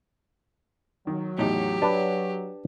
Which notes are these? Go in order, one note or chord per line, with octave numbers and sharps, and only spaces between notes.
D#3 F#3
E2 A2 D#4 G4
D4 B4 A5